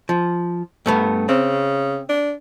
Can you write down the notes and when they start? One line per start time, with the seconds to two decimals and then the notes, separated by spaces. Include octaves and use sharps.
0.09 F3
0.86 G2 A3 B3
1.29 C#3 C4
2.09 D4